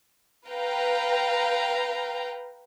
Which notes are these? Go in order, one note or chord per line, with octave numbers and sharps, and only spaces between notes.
B4 F5 G5 A#5